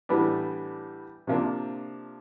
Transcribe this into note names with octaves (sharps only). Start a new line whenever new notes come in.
A2 E3 G3 B3 D4
C3 F3 A#3 D4